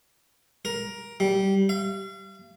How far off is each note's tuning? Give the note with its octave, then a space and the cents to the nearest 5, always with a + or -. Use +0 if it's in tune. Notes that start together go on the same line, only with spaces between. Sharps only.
A#4 +15
G3 -15
F5 -40